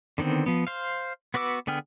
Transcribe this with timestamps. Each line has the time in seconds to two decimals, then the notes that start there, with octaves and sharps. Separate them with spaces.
0.18 D3 D#3 B3 C4
0.46 F3 B3
0.67 C5 F5
1.34 B3 F#4 B4 D6 E6
1.67 D3 B3 G#4 G5 F6